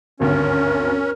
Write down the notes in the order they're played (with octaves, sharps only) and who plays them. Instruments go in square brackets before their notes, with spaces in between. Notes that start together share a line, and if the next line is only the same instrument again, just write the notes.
[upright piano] G#1 D2 G2 [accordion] C#4 [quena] A#4